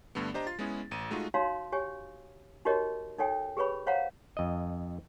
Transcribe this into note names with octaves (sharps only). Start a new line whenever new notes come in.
G2 D3 A3 B3
D4 G4 C5 D#5 A#5
F4 C6 A6
G#3 B3 C#4 E4 G#4
A1 D#7
G#3 A3 D#4 F4 F#4
D#4 F#4 C#5 F5 A#5 C6
G4 C#5 G#5
D#4 F#4 G4 A#4 C#5 D#5
D#4 A4 C#5 G5 G#5
G4 G#4 B4 C#5 B5
C5 C#5 F5 F#5 A#5
F2 D#5